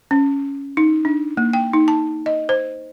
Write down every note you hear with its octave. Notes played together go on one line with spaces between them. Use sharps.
C#4
D#4
D4
A#3
G5
D#4
A5
D#5
C5